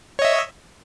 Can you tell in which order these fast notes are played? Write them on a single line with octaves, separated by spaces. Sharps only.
C#5 D#5 E5